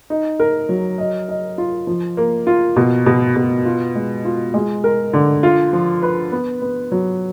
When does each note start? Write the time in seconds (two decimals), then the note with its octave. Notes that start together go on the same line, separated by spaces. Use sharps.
0.10 D#4
0.39 A#4
0.69 F#3
0.98 D#5
1.29 D#5
1.58 F4
1.87 F3
2.17 A#3
2.47 F4
2.76 B2
3.06 B2
3.36 B2
3.65 F4
3.95 G#3
4.25 F4
4.54 G#3
4.84 A#4
5.14 D3
5.43 F4
5.73 F3
6.03 B4
6.32 B3
6.62 B3
6.92 F#3